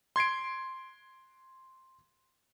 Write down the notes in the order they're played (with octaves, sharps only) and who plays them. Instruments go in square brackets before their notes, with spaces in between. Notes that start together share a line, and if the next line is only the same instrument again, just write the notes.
[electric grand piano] C6 G#6 C7 D7